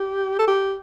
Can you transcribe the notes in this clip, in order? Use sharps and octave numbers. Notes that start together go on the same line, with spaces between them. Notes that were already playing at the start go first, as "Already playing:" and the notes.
Already playing: G4
A4
G4